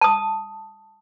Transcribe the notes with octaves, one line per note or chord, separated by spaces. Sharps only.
A5 D#6